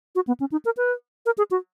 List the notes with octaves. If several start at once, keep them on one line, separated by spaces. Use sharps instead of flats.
F#4
B3
C#4
D#4
A#4
B4
A#4
G#4
F#4